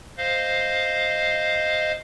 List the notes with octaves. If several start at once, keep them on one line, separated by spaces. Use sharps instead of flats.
C5 D#5 F5